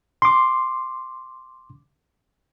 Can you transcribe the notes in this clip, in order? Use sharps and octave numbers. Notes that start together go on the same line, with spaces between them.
C6 D6